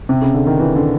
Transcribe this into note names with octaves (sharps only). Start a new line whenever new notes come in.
C3
C#3
D3
D#3
E3
D3